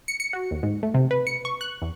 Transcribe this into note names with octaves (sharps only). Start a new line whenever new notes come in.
C#7
C#7
F#4
D#2
G#2
A3
C3
B4
C#7
C#6
F#6
E2